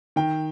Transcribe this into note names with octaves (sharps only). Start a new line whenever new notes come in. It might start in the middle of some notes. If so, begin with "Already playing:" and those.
D#3 G5